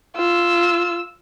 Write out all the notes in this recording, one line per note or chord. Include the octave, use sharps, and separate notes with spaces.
F4 E6